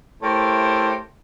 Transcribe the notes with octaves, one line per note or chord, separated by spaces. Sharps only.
A3 E4 G4 A#4 C5 C#5